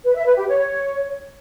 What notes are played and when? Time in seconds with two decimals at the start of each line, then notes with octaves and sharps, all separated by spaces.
0.04 B4
0.15 E5
0.26 B4
0.37 G4
0.48 C#5